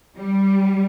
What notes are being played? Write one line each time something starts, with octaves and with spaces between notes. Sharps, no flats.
G3